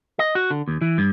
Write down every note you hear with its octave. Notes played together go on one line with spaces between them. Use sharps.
D#5
F#4
D3
D#2
E3
G2